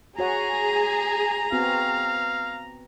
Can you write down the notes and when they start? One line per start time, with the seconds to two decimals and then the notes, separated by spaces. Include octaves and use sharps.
0.19 F#4 G#4 C#5 F#5 A#5
1.52 B3 C4 F#4 F5